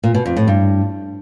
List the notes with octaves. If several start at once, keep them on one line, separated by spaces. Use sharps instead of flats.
A#2
B2
F2
A2
G2